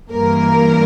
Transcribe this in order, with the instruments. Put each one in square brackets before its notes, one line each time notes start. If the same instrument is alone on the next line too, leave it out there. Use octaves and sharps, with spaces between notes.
[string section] G2 E3 A#3 A#4